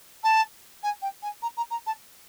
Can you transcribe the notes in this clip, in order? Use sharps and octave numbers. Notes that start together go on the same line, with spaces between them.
A5
G#5
G5
G#5
A#5
A#5
A#5
A5